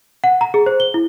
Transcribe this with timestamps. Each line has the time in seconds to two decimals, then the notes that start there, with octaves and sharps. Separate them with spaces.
0.24 F#5
0.41 A#5
0.54 G#4
0.66 C5
0.80 G7
0.94 E4